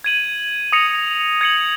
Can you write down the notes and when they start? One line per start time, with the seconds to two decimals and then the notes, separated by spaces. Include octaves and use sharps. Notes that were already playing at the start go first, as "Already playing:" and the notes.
0.04 G#6 D#7 F#7
0.72 D#6 A#6 C#7 F7
1.41 G#6 C#7 F#7